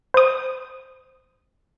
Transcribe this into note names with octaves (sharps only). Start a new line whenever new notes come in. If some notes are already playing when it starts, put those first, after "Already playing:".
C5 D#6